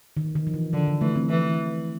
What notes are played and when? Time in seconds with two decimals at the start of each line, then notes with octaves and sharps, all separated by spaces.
0.17 D#3
0.36 D#3
0.47 F3
0.54 E3
0.73 D3 F3
0.87 F3
1.01 E3 A3
1.16 C4
1.30 E3